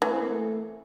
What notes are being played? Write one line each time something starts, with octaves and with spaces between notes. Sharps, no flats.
E3 A3
C4
A#3
A3